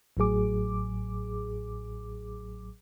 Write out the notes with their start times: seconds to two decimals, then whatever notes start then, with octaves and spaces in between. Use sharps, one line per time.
0.17 A1 A2 F#3 G#4 D6